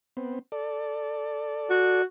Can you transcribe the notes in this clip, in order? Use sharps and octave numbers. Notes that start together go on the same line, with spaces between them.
B3 C4
A4 D5
F#4